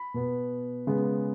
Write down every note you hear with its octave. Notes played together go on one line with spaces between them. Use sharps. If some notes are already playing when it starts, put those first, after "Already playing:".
Already playing: B5
B2 B3
C#3 G#3 B3